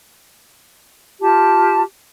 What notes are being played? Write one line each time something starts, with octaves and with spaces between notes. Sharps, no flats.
F4 G4 A5